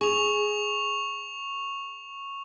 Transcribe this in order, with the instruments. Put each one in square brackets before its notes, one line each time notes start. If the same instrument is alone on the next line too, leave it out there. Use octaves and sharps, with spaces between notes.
[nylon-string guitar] G#4 [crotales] C#6 F7